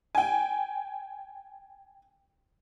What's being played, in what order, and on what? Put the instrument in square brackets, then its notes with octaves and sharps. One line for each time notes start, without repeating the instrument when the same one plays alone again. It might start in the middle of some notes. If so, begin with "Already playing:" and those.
[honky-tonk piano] G5 G#5